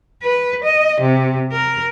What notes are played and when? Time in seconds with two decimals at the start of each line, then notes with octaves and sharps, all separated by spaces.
0.23 B4
0.64 D#5
1.01 C3
1.53 A#4